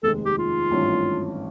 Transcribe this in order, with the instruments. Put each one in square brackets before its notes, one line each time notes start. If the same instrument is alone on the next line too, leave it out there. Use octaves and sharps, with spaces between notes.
[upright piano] F1 D#2 D#3 G#3 [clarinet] A4
[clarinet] G4
F4
[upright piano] G#1 G2 E3 A3 C#4